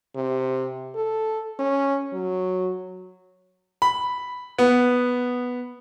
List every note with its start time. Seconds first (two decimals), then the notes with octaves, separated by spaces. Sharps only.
0.15 C3
0.96 A4
1.59 C#4
2.13 F#3
3.82 B5
4.58 B3